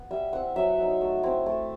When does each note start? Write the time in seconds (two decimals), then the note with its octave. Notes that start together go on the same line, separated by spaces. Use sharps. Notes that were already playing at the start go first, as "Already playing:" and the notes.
Already playing: B3
0.11 G3 E5
0.33 C4 E4 F#5
0.56 F#3 E5
0.78 B3 D#4
1.01 A3
1.23 C4 E4
1.46 A3